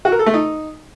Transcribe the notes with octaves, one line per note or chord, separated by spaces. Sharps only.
F#4
A#4
A4
A3
D#4